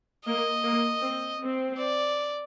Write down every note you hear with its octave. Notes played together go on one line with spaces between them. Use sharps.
A#3 D#5
A#3
C4
C4
D5